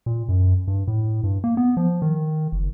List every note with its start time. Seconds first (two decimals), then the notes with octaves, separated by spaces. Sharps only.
0.06 A#2
0.29 F#2
0.68 G2
0.88 A2
1.24 G2
1.44 A#3
1.57 B3
1.77 F3
2.02 D#3
2.52 F#1